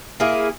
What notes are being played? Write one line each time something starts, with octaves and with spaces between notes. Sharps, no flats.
A#3 E4 G#4